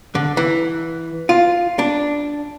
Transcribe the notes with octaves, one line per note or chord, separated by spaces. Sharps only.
D3
E3
F4
D4